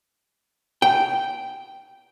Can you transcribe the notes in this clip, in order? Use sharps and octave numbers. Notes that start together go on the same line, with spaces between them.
G5